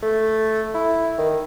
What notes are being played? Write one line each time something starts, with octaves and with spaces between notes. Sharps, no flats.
A3
E4
D#3